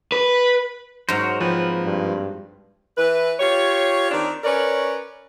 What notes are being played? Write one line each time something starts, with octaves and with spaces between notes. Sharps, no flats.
B4
G#2 F#3 F#4 A#4 C5 A#6
F3 A#3 C4 B4
G2
E3 B4
F4 G4 C#5
D#3 C4 D4
C#4 A#4 B4 C#5 D5